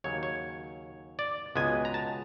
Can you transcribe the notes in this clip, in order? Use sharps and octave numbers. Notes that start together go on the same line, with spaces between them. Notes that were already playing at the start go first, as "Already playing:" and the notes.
D#2 C#3 F#3 C#5
C#5
D5
C#2 B2 G#3 B3 G#5
A#5
A5